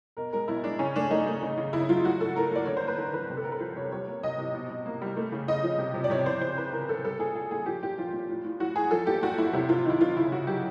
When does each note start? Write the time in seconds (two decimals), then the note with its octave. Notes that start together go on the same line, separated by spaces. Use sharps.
0.17 B2 A#4
0.33 G#3 A#4
0.48 B2 E4
0.64 G#3 D4
0.79 C#3 C#4
0.96 A3 D4
1.10 A3 D#4
1.26 A3
1.43 C#3
1.57 C#3
1.73 C#3 E4
1.89 F#3 F4
2.04 A2 F#4
2.20 A2 A4
2.36 A2 A#4
2.51 A#3 D5
2.65 D3 C#5
2.77 C5
2.83 A#3
2.88 B4
2.98 D3 A#4
3.13 D3 B4
3.30 C3
3.37 A4
3.44 C3 A#4
3.52 B4
3.60 F3 C5
3.76 C3 C#5
3.92 G3 C#5
4.07 A#3
4.23 C3 D#5
4.38 C3
4.54 B2
4.70 B2
4.86 A#3
5.02 G3
5.17 A3
5.32 C#3
5.48 C#3 D#5
5.64 F3
5.79 C3
5.94 C3
6.04 D5
6.10 C3 C#5
6.26 C3 C5
6.41 C#3 C5
6.57 E3 B4
6.73 C#3 A#4
6.89 C#3 A4
7.05 G3 A4
7.19 A#2 G#4
7.35 A#2 G#4
7.51 A#2 G#4
7.66 F3 G4
7.83 A#2 G4
7.98 F3 F4
8.13 A#2
8.29 A2
8.44 A2
8.60 E3 F#4
8.76 E3 G#4
8.91 F3 A4
9.07 A#2 G4
9.22 A#2 F#4
9.38 A#2 E4
9.53 C3 E4
9.69 C3 F4
9.85 D#3 E4
10.00 D#3 F4
10.17 C#3 E4
10.32 C#3 F#4
10.47 F#3 G4